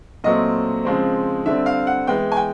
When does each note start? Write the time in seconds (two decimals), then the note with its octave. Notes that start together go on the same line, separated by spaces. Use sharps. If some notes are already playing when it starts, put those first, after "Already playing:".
0.24 A#2 F#3 A3 C4 D#5
0.85 C#3 F3 G#3 C4
1.45 D3 G3 C4 E5
1.66 F5
1.87 F#5
2.07 E3 G#3 B3 G5
2.32 G#5
2.37 G5